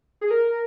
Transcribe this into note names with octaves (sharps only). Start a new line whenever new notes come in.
G#4
A#4